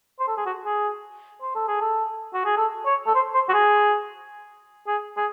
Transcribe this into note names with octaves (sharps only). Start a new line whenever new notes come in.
C5
A4
G#4
F#4
G#4
C5
A4
G#4
A4
F#4
G#4
A4
C#5
A4
C5
C5
F#4
G#4
G#4
G#4